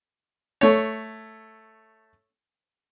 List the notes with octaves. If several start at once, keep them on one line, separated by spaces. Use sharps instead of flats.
A3 C#5